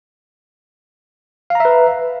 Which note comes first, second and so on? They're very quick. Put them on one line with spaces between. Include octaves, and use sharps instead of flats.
F5 A#5 E5 B4